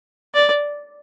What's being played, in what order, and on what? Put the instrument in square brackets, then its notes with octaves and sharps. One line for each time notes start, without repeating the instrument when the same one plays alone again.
[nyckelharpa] D5